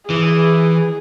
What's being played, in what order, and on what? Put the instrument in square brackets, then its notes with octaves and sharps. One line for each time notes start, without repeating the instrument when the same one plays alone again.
[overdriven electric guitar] E3 [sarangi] G#4